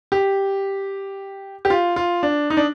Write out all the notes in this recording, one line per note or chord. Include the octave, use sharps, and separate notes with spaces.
G4
G4
F4
F4
D4
D#4
D4